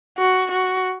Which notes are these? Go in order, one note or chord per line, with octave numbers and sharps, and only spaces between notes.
F#4
F#4